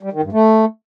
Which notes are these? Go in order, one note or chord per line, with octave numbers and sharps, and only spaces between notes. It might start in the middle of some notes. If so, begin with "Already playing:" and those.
G3
D#3
G2
A3